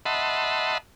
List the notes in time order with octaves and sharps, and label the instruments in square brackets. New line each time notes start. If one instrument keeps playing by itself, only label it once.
[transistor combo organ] D#5 E5 F#5 A5 B5 C6